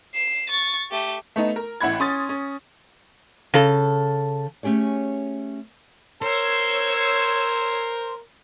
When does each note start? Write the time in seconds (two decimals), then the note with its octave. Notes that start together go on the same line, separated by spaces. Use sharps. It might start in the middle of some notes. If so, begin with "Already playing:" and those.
0.14 C7 E7
0.49 C#6 A6
0.90 A3 G4
1.36 A3 B3 D#4
1.56 A#4
1.81 A1 E4 F#5 B5 G#6
2.00 C#4 C6 D#6 A6
2.29 C#4
3.54 C#3 A4
4.63 A3 C#4 G4 G#4 C#5
6.22 A#4 C5 C#5 E6 G#6